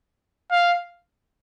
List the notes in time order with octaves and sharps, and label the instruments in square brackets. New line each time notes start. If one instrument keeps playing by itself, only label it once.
[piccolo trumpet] F5